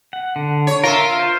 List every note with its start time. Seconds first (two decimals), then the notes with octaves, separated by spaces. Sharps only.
0.13 F#5
0.36 D3
0.67 C#5
0.84 F4 A#4 E5
1.19 C5